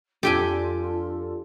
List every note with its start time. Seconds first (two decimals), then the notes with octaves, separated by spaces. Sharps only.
0.23 F2 D4 F4 G4 A4 G5 G#5